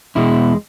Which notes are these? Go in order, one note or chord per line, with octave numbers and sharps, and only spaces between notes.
E2 B2 G#3 E4